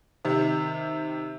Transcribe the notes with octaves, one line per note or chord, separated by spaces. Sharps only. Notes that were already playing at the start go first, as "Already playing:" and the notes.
C3 D#3